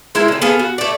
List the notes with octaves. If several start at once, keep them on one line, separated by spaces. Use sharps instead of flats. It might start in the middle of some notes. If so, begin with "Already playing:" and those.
G#3 E4 F4 A#4
D3 C4
B3 G#4 A4 F5
F#4
A3 D5